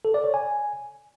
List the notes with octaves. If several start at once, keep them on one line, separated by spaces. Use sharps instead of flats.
A4
D5
C#5
G#5